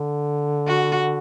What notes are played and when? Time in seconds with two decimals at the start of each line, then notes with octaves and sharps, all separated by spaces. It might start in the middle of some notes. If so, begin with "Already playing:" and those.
Already playing: D3
0.67 F#4